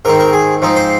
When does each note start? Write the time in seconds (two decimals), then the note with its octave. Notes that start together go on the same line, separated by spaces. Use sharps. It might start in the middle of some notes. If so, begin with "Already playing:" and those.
0.05 G#2 D#3 C4 A#4
0.20 A#4
0.33 G#4
0.62 G#2 F3 C4 D#4
0.76 C5